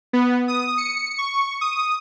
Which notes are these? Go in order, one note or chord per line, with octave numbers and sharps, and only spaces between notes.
B3
D#6
C#7
C#6
D#6